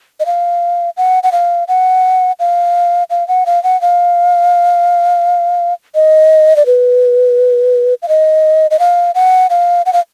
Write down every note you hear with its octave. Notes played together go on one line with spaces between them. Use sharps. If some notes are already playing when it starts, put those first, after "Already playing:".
D#5
F5
F#5
F#5
F5
F#5
F5
F5
F#5
F5
F#5
F5
D#5
D5
B4
F5
D#5
D#5
F5
F#5
F5
F#5
F5